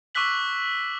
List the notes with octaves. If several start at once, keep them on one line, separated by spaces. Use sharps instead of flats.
C#6 D6 E6 F#6 B6 F#7